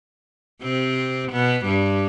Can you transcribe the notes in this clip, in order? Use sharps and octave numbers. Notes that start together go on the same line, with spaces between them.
C3 C4
B2 B3
G2 G3